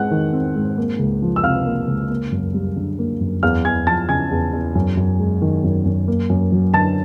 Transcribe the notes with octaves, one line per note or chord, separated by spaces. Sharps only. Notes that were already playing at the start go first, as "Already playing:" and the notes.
Already playing: G#2 G#3 C4 F#5 F#6
D#3
C4
G#2
A#3
C#2
F3
E6
C3 F5 F6
A#3
C#2
A#3
F#2
G3
D3
A#3
F#2
E2 F5 F6
E2 G#5 G#6
F3 A5 A6
C#3 G#5 G#6
E2
E2
F#2
F#2
G#3
D#3
F#2
F#2
A#3
F#2
F#3
D3 A5 A6